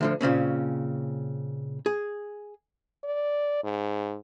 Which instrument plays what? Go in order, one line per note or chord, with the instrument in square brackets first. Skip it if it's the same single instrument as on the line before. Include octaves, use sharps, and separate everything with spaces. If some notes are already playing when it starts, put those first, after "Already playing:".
[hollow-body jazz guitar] D2 D3 F3
A#2 C#3 C4 C#4
G#4
[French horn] D5
G#2